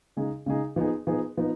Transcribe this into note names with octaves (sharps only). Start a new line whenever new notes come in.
C#3 G#3 D#4 G#4
C#3 G#3 D#4 G#4
F3 B3 D#4 G#4
F3 B3 D#4 G#4
F3 B3 D#4